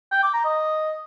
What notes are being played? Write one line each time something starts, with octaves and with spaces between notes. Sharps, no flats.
G5
D6
A#5
D#5